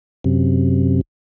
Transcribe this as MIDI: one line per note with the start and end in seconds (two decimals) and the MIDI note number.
0.24 1.01 42
0.24 1.01 48